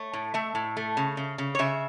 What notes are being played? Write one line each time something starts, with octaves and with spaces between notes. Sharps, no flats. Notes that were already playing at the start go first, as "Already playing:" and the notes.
Already playing: A3 C#5
A2
A3 E5
A2
A3
C#3
C#3
C#3
C#5
C#3 E5